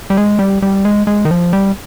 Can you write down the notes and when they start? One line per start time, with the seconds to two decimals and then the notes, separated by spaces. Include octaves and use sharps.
0.10 G3
0.17 G#3
0.39 G3
0.62 G3
0.85 G#3
1.07 G#3
1.25 D#3
1.31 F3
1.53 G3